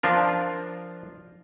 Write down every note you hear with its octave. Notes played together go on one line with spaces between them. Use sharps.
F3 D4 F4 A#4